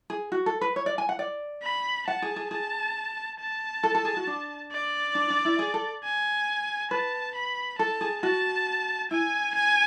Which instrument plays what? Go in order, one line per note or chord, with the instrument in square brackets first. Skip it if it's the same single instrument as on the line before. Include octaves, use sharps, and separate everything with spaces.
[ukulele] G#4
F#4
A4
B4
C#5
D5
G#5
F#5
D5
[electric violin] B5
[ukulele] F#5 [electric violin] A5
[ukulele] G#4
G#4
[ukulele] G#4 [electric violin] A5
[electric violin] A5
[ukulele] A4
A4
G#4
F#4
D4
[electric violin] D5
[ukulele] D4
D4
E4
G#4
A4
[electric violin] G#5
[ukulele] B4 [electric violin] A5
[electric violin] B5
[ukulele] A4 [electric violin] A5
[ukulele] G#4
[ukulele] F#4 [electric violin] A5
[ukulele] E4 [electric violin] G#5
[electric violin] G#5